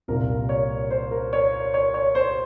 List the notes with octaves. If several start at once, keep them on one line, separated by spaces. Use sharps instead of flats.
C2 A#2 G3 A#4
C#5
C5
A#4
C#5
C#5
C#5
C5